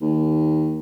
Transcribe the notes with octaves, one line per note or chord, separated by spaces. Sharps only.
D#2